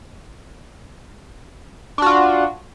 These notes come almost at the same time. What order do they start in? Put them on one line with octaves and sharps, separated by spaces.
D4 F#4 F4